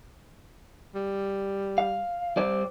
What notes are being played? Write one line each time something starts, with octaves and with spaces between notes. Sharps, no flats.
G3
F5
G3 C5 D5